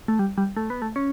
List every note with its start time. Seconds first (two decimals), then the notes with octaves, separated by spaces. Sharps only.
0.08 A3
0.19 G3
0.38 G3
0.57 A3
0.70 B3
0.82 A3
0.96 C#4